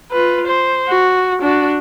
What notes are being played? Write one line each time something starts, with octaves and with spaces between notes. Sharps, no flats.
F4 B4
C5
F#4
D4 F#4